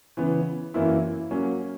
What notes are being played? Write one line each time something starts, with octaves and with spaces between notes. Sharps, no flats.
C#3 E3 B3
F#2 E3 A#3 E4
F#3 A#3 C#4